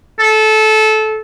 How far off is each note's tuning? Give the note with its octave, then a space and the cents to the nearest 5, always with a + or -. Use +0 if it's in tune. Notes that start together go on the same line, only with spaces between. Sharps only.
A4 -20